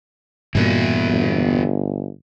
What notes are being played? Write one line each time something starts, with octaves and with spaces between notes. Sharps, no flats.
G2 A#2 E3 B3 F#4
G1